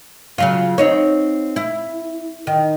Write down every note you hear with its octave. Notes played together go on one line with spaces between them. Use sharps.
C#3 F#3 F4
C4 D#4 C#5
E4
D#3